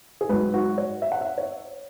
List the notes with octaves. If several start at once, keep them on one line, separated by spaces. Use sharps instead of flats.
G#4
G#2 F#3 B4
F#4
C#5
E5
F#5
E5
C#5